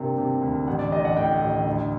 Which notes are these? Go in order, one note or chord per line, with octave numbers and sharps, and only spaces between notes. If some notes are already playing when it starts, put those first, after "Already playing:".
Already playing: G2 C3 A#3
C3
D2
A1 F#5
D5
A1 D#5
F#5
A2 G5
A1
D2